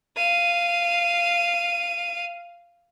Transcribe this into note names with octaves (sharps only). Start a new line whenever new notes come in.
F5 D#7